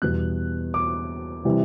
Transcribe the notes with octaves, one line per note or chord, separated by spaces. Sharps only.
E2 B2 G3 F#6
D6
C3 E3 G3